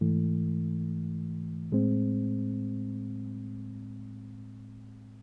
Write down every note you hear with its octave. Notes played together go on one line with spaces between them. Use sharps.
G#2 E3 A3
A2 G#3 C4